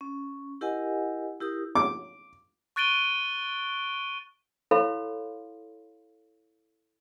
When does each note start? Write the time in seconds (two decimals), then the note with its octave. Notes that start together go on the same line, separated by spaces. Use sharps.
0.01 C#4
0.61 E4 G4 A#4 D#5 F#5 G#5
1.41 E4 G4 A#4 D#6
1.75 D6
2.76 C#6 F#6 A6 D7 D#7 G7
4.71 E4 A4 C#5 F5 B5 C6